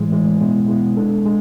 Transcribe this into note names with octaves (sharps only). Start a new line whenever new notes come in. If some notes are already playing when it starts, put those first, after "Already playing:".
Already playing: A2 E3 G#3
A2 E3 G#3
B2 G#3 B3 E4
B2 G#3 B3 E4
G#3 D4 A4
G#3